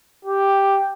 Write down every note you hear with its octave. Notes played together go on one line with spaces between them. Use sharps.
G4